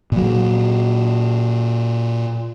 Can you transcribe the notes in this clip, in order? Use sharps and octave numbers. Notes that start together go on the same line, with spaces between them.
A#2 F#3